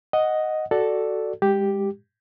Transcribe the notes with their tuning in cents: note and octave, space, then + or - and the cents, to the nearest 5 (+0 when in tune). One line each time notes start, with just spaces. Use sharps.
D#5 +0 F#5 +0
F#4 +10 A4 +0 D5 +0
G#3 -30 G4 +0